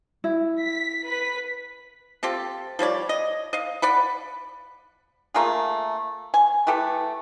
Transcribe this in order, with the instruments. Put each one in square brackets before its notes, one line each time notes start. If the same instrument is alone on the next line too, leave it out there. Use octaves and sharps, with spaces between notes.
[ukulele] E4
[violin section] B6
B4 B6
[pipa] C4 F4 G4 A4
F3 G3 C#5 D5
D#5
D#5 F5
D5 F#5 B5
A3 A#3 F4 G#4
G#5
E3 A3 G4 A4